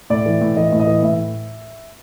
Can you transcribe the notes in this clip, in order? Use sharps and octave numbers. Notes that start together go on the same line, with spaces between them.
A2 D5
E3
A2
E3 D#5
A2
D#5
E3
A2 E5